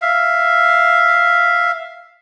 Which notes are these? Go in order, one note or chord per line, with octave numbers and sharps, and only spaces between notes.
E5 F5